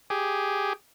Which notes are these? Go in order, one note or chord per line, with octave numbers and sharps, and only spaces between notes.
G4 G#4